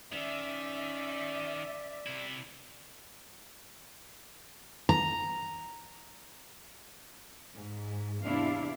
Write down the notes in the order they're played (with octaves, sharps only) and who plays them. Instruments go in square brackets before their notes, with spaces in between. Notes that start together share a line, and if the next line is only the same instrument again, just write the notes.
[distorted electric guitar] D#3 [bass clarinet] C#4 [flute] D5 [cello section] E5
[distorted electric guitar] C3 E4
[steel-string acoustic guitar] A#5
[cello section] G#2
E2 C3 D4 E4 F5